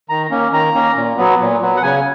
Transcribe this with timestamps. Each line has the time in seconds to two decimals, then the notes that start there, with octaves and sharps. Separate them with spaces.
0.09 D#3 A#5
0.30 A#3 C#4
0.52 D#3 A#5
0.74 A#3 C#4
0.96 A#2
1.17 F#3 B3
1.40 A#2
1.61 F#3 B3
1.77 F#5
1.82 C#3 G#5